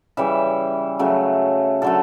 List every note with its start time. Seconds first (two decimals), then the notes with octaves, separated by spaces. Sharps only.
0.17 C#3 E3 G3 E5
0.99 C#3 F#3 A3
1.82 D3 F#3 A3 A4